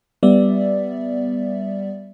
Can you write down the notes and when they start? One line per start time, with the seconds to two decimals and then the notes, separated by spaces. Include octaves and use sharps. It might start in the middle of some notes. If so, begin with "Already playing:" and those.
0.23 G3 B3 D5 E5